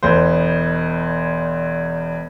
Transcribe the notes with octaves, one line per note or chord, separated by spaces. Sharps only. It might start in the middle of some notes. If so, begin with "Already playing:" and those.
E1 E2 C5